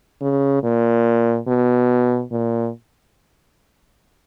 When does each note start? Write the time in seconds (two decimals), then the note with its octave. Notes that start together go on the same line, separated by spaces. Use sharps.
0.21 C#3
0.63 A#2
1.48 B2
2.31 A#2